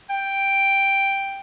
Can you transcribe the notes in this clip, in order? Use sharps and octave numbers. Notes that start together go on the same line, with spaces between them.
G5